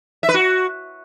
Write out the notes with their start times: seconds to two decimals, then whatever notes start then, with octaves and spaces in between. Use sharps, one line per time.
0.23 E5
0.29 B4
0.34 F#4